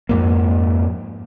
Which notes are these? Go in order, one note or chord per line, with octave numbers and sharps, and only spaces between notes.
F2 G#2 A#3